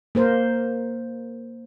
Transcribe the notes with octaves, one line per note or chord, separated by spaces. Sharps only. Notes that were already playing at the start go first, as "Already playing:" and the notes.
A#3 A#4 C5